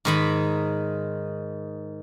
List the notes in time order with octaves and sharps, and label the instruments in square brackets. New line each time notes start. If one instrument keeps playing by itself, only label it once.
[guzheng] G#2 D#3 B5